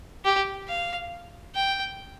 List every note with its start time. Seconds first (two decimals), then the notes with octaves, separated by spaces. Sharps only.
0.25 G4
0.68 F5
1.55 G5